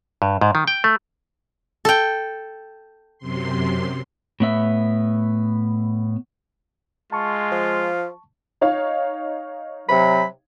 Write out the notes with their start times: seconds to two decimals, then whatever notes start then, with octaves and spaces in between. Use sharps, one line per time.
0.22 G2
0.41 G#2
0.55 D#3
0.67 G5
0.84 A3
1.85 A4 G5
3.19 F#2 C3 C6
4.40 A2 B3 E5
7.12 G#3 F4 A5 C#6
7.52 F3
8.61 D#4 C#5 F5
9.89 C3 F#3 B5